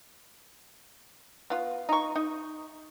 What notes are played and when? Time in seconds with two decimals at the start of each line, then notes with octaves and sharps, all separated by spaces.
1.50 B3 F4
1.89 D#4 C#6
2.16 D#4